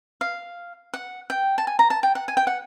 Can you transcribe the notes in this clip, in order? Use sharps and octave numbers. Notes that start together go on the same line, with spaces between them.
F5
F#5
G5
A5
G#5
A#5
A5
G5
F#5
G#5
G5
F#5